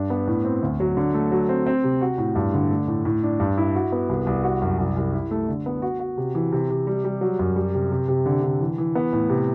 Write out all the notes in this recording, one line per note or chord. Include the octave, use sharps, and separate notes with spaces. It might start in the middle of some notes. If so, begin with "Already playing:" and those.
Already playing: G2 D4
B3
A2
C4
D2
F#3
D3
A3
F#3
C4
C4
C3
F#4
A2
G2
D3
A3
A2
A2
D4
G2
E4
F#4
B3
C2
C2
F#4
F#2
C2
C2
E4
A3
D3
B3
F#4
F#4
C3
E3
C3
C3
G3
G3
F#3
F#2
G3
C3
C3
C3
D3
D3
E3
E3
B3
A2
C3